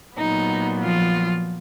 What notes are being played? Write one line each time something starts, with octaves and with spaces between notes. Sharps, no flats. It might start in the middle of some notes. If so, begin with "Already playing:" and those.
A#2 F#3 B3 D#4
F3 F4